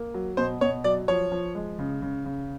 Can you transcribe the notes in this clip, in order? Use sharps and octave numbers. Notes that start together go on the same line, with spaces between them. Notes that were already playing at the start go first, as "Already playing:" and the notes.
Already playing: A#3
F#3
B2 C5
B2 C#5
F#3 D5
F3 C#5
F3
G#3
C#3
C#3
C#3